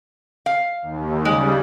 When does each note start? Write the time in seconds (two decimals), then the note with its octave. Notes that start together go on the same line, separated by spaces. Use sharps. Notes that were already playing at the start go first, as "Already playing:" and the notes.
0.46 F5
0.82 D#2
1.25 C#3 G3 G#3